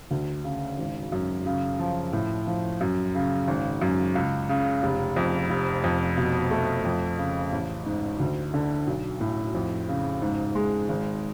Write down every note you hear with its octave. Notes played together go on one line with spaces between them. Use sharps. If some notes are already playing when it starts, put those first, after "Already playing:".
D2
C#3
G#1
F#2
C#3
F3
A2
F3
F#2
C#3
G#1
F#2
C#2
C#3
F1
F2
F1
F2
B2
A3
F2
C#3
A1
G#2
D2
D3
B1
A2
F2
C#3
G#2
G#3
G#1